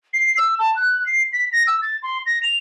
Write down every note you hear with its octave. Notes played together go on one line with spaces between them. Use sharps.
C7
E6
A5
F#6
C7
B6
A#6
E6
A6
C6
A#6
F7